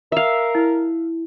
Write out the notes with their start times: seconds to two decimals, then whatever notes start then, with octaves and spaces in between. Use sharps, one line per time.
0.12 A#4 E5 F5
0.55 E4